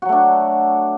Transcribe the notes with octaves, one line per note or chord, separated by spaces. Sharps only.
F#3 A3 D4 F#4